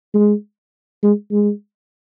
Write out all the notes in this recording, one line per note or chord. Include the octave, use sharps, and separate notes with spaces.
G#3
G#3
G#3